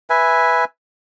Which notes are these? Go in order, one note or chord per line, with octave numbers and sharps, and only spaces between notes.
B4 E5 G#5